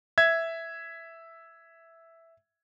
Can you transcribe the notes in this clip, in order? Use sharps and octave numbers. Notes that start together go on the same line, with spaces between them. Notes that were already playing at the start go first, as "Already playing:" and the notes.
E5 G#6